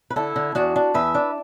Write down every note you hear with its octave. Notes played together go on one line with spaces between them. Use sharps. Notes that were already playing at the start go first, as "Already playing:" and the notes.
B4
D3 E4 A4
D3
E2 D4 F#4
D4
E2 B4 E5
D4